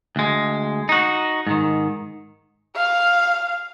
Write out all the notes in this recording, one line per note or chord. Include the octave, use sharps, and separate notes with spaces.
D2 G#3
D#4 F#4
G#2 D#3
F5